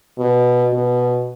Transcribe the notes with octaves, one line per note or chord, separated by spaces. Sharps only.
B2
B2